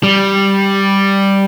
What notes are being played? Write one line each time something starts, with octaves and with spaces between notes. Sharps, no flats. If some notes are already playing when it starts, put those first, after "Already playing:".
G3